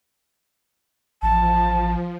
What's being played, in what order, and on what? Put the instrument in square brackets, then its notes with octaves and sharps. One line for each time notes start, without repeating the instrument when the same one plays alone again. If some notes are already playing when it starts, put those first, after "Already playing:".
[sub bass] A1 [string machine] F3 [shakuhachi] A5